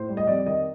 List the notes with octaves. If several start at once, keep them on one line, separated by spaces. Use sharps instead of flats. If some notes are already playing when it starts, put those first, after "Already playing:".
Already playing: A2 C5
G3
D#5
F2 D5
D#3 D#5